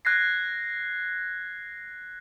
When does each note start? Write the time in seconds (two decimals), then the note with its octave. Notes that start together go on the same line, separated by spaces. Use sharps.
0.05 F#6 G#6 A#6 C7